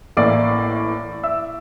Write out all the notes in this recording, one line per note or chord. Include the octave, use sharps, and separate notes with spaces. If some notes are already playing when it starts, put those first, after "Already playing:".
A1 A2 E3 A#3 D5 D6
E5 E6